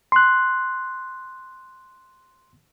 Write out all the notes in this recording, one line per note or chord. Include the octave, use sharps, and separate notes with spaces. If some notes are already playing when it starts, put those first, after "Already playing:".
C6 F#6